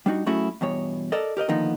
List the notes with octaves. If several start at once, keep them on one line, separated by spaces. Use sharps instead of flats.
G3 D4 D#4 F#4
F#3 A3 C#4 E4 F#4 G#4
E2 G2 B2 C#5
A4 A#4 D5 D#5
G4 A#4 D5 D#5
D3 D#3 F3 A#3 B3 D#4